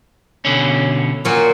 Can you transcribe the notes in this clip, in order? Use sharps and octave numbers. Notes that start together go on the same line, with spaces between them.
B2 D3 C#4
A#2 F#3